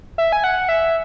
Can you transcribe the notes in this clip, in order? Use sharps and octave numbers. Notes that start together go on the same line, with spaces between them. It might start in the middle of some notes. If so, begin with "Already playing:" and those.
E5
G#5
F#5
E5